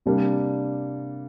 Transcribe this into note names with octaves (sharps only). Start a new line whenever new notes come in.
C3 G3 A#3 D4